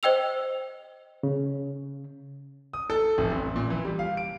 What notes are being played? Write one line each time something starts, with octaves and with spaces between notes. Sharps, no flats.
C5 D#5 G5 E6 F7
C#3
D#6
A4
F1
A1
A#2
E3
G3
F5
D7